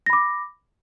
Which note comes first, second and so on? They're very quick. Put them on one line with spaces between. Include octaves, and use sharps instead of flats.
A#6 B5 D6